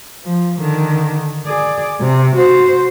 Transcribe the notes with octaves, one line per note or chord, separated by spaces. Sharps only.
F3
D3 D#3
G#4 D5
C3
F#4 C5